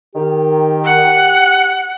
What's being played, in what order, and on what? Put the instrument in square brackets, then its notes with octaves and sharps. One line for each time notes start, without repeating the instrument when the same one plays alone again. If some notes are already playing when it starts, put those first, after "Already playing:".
[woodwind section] D#3 [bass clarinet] G4
[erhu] F#5